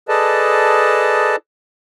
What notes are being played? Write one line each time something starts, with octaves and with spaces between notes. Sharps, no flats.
G#4 A4 B4 D5 D#5 A5